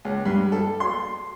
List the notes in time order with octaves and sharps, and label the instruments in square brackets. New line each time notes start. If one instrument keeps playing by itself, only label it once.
[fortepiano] C#2
G2
A4
C6